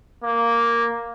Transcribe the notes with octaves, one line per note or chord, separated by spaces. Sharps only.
A#3